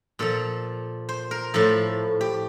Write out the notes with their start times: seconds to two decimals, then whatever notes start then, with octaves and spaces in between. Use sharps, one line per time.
0.19 A#2 F3 A4
1.09 C5
1.31 A#4
1.54 A2 F3 A4
2.21 G4